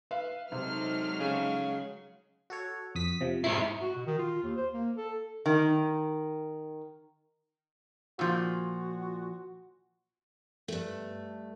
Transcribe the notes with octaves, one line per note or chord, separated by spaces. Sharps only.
B4 E5 F5
C3 F#3 G#3 D#4 A4 F6
C#3
F#4 A4 C#5
F2 D#6 B6
C3 F3
G#2 E4 C#6 C7
F#4
B2
D#3
F4
D#2
C5
A#3
A4
D#3
A#2 F3 F#4
G2 A3